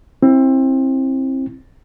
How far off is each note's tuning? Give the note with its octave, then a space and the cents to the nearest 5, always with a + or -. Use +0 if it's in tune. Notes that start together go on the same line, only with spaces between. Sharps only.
C4 +25 E4 +0